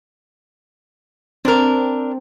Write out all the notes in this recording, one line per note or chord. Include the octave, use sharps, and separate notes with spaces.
C4 D4 A#4